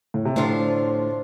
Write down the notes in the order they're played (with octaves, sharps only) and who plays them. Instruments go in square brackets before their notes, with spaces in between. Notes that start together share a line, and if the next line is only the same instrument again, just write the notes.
[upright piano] A2
C3
[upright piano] A2 D3 [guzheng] F3 D4 F4